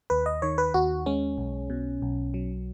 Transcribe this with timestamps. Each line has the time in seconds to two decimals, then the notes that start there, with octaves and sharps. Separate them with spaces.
0.10 D#2 B4
0.26 D#5
0.42 D#3 C#5
0.58 B4
0.74 D#2 F#4
1.06 G#3 C#4
1.38 B1
1.70 B2
2.02 B1
2.34 F#3